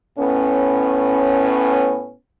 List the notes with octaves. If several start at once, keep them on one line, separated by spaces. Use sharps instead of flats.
A2 B3 C#4